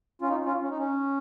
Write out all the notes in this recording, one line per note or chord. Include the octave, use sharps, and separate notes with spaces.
C#4 F4
D#4
C#4 F4
C#4
D#4
C#4